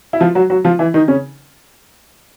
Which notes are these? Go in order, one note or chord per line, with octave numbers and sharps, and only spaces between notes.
E4
F3 F4
F#3 F#4
F#3 F#4
F3 F4
E3 E4
D#3 D#4
C#3 C#4